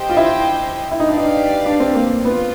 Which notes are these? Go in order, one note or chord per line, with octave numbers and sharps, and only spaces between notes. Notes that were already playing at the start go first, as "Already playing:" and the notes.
Already playing: G4 C5 D#5 G5
F4
E4
E4
D#4
D4 G4 B4 D5 F5
D#4
D4
C4
A#3
B3 F4